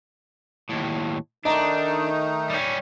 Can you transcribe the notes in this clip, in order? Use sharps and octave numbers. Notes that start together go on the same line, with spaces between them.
D#2 A2
D#3 A3 D4 D#4 D#5 A#5
G3 C#4